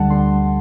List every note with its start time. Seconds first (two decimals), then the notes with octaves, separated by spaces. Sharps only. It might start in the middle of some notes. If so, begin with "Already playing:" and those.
Already playing: D2 D3 G3 F#5 A5
0.10 D3 G3 C6